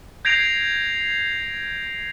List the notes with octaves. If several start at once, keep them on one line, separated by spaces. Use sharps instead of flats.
G6 G#6 A#6 C7 D7 F7